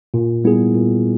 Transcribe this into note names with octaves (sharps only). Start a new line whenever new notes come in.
A#2
G3 B3 E4 G#4
A#2